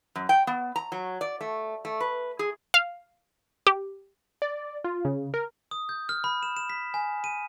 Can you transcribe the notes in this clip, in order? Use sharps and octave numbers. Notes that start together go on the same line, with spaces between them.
F#2
G5
B3
A#5
F#3
D5
A3
A3
B4
G#4
F5
G4
D5
F4
C#3
A#4
D#6
G6
F6
B5
E7
E7
B6
G#5
D#7